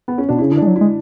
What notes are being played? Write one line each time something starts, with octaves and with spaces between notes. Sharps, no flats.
B3
C#4
B2 D4
C#3 E4
D3 E4
G#3 D4
F#3
E4
G#3